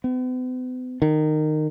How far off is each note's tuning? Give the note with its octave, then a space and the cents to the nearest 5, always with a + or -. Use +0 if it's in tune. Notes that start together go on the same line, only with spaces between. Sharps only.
B3 +45
D#3 -20